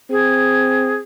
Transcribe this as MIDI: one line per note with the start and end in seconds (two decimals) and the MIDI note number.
0.11 1.00 60
0.11 0.96 68